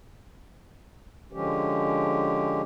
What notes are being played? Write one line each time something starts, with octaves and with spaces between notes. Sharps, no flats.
D3 F3 G#3 C#4 G4